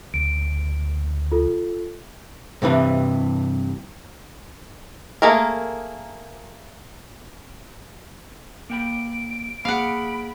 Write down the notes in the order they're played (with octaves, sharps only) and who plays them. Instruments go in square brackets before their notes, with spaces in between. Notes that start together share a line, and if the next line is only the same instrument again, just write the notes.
[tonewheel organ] D2 [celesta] D7
[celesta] F4 A4
[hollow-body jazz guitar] G2 C3 E3 B4
[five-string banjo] A3 A#3 G#4 A#4
[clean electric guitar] A#3 G5 B5 [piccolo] D7
[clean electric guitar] A#3 G#4 [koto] F5 F#5 [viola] B5